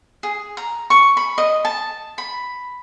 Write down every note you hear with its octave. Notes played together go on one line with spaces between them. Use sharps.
G#4
A#5
C#6
B5
D#5
A5
B5